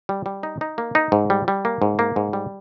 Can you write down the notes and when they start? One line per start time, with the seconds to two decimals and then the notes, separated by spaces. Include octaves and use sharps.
0.09 G3
0.26 G3
0.43 D#4
0.61 D#4
0.78 A#3
0.95 D#4
1.12 G#2
1.30 G3
1.48 G3
1.65 A#3
1.82 G#2
1.99 A#3
2.16 G#2
2.33 G3